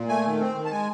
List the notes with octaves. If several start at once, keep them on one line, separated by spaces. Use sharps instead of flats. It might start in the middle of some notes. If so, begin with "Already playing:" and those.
Already playing: A#2
A3 G#5
D#3
C4
D#3
A5
G#3 G#5